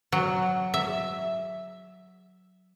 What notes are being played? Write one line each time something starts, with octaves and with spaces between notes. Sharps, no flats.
F#3
E5